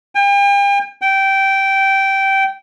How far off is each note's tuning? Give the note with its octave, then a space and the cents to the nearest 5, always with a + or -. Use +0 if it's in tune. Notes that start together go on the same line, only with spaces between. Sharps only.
G5 +40
G5 -15